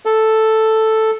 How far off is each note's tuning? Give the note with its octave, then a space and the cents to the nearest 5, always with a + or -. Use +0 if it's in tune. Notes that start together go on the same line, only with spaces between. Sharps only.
A4 +0